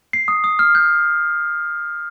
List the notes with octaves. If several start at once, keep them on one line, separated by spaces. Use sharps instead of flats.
C7
D#6
D#6
F6
G6